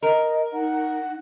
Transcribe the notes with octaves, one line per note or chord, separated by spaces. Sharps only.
A#4 D#5
D#4 F#5